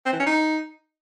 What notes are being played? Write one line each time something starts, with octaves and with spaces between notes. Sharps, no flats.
C4
E3
C#4
D#4